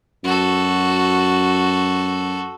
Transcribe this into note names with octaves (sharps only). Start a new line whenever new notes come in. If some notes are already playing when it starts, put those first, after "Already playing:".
F#2 F#4 A4